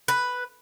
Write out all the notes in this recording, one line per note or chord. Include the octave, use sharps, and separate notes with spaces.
B4